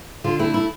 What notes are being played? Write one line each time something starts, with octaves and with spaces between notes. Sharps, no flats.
D3 F4
A3 E4
E4